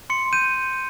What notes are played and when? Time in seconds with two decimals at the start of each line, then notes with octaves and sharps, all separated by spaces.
0.10 C6 C#7
0.33 G6 D#7